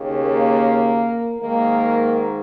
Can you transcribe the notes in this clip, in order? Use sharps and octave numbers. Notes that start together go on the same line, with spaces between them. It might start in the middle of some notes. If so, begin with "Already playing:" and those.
Already playing: D#2 C#3
A#3
G#2 D#3 A#3